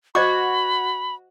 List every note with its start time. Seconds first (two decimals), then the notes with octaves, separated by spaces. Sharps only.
0.15 F#4 C5 D#5 B5 C#6 D6 G#6